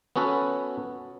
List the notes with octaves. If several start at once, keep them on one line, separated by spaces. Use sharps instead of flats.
B3 C#4 F#4 A4 B4